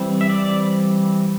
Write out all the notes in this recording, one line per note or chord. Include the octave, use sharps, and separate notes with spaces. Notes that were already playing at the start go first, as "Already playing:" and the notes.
Already playing: E3 G3 C4
E5
D5